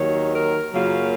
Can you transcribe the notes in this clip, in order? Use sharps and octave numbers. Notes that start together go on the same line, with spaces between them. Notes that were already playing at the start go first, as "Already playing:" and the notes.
Already playing: D#2 D#3 F#3 C#5
A#4
F#2 C#3 F#3 A#3 F4